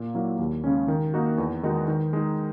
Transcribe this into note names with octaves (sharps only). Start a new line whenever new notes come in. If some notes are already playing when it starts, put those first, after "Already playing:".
Already playing: A#2
F#3 A#3 E4
D#2
C#3 G#3 C#4
D#3
A#3 D#4 F#4
E2
D#3 G#3 D#4 F#4
D#3
G#3 D#4